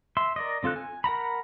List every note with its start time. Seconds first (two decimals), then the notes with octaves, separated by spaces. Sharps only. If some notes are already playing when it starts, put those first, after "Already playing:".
0.17 E5 C6
0.36 A#4 D5 D#5
0.63 D3 C4 F4 A4 F#6
0.76 G#5
1.04 A#4 F#5 A#5 B5